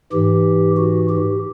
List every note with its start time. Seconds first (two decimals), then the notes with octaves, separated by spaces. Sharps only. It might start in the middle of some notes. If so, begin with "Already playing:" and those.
0.12 G#2 E3 G4
0.77 F#4
1.09 G4